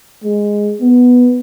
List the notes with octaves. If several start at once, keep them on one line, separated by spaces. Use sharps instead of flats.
G#3
B3